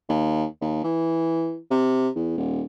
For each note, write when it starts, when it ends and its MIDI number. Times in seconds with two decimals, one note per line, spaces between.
0.09 0.45 39
0.61 0.84 39
0.84 1.58 52
1.71 2.09 48
2.16 2.34 40
2.38 2.63 27